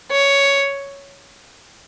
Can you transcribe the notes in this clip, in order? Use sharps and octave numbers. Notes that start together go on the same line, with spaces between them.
C#5